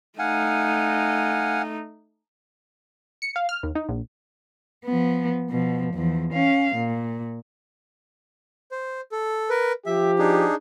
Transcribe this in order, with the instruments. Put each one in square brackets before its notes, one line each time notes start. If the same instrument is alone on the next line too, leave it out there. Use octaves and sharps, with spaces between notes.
[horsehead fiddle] A3 D#4 [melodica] F5 F#5 G#5
[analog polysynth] C#7
F5
F6
D#2
D#4
A#1
[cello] F3 B3
B2 F3
E2 F3
C#4 F5
A#2
[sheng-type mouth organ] C5
A4
A#4 B4
[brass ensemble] F3 G4 [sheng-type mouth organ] E5
[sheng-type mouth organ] D4 D#4 G#4